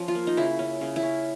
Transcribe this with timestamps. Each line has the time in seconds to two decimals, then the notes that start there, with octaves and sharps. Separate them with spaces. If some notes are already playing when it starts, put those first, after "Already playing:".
Already playing: F3 C#4
0.08 F4
0.15 A#3
0.27 D#4
0.37 C#3 E4
0.59 C#4
0.81 C#3
0.96 E4
1.03 C#4